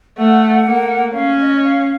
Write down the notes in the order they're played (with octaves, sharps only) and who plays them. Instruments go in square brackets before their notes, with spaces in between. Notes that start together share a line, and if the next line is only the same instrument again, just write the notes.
[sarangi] A3 [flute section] F#5
[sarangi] A#3
[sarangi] C#4 [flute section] F5
[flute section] D#5
F5